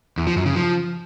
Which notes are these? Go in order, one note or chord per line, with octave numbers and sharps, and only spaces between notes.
E2
F3
F#2
C#3
F3